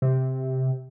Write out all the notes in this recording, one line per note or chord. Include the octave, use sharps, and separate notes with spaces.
C3